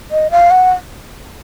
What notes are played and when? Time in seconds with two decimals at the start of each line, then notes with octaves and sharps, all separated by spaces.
0.11 D#5
0.31 F5
0.51 F#5